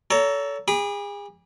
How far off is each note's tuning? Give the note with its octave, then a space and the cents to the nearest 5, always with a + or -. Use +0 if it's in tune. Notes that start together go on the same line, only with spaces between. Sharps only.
A4 +0 C#5 +35 A#5 +0
G#4 -35 B5 -30 D6 +0